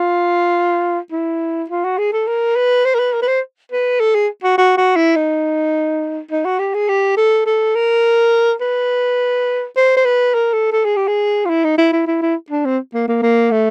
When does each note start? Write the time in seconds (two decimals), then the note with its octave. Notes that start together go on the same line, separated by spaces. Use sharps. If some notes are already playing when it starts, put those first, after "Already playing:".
Already playing: F4
1.12 E4
1.70 F4
1.84 F#4
1.98 G#4
2.13 A4
2.27 A#4
2.56 B4
2.85 C5
2.95 A#4
2.99 B4
3.13 A#4
3.22 B4
3.27 C5
3.72 B4
4.00 A4
4.15 G#4
4.43 F#4
4.58 F#4
4.77 F#4
4.96 E4
5.16 D#4
6.31 D#4
6.45 F#4
6.59 G4
6.74 G#4
6.88 G4
7.17 A4
7.46 A4
7.75 A#4
8.61 B4
9.77 C5
9.96 C5
10.05 B4
10.34 A#4
10.53 A4
10.72 A4
10.85 G#4
10.96 G4
11.07 G#4
11.45 F4
11.49 E4
11.64 D#4
11.78 E4
11.93 E4
12.07 E4
12.22 E4
12.50 D4
12.65 C4
12.94 A#3
13.08 A#3
13.22 A#3
13.51 A3